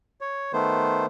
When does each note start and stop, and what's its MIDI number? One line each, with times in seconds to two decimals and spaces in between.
0.21 0.52 73
0.53 1.06 51
0.53 1.06 57
0.53 1.06 59
0.53 1.06 72